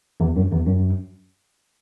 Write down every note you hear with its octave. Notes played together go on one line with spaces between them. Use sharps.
E2
F#2
E2
F#2